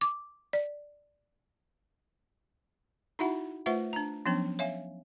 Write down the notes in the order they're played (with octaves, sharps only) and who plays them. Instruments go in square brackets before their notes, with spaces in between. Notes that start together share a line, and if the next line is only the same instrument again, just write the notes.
[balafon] D6
D5
D#4 E4 F#4 E5 F#5 B5
A3 F4 B4 C5 E5 F#5
D4 A#5
F3 F#3 B3 C#4 D4
C#5 E5 F5 G#5